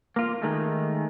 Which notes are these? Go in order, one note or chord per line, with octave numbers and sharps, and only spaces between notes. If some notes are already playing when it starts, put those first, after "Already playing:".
A#3 F4
D#3 G#3 A3